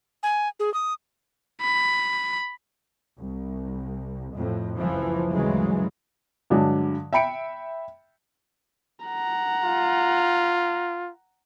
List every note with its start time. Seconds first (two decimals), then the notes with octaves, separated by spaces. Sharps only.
0.23 G#5
0.60 G#4
0.74 D#6
1.62 B5
3.19 C2
4.36 F2 A2
4.79 F#1 C#2 E3 F3
5.32 D2 G2 C#3 E3 F#3 G#3
6.50 G2 D3 F#3 G#3
7.13 E5 G5 B5 C#7 D7
9.06 F#5 A#5
9.64 F4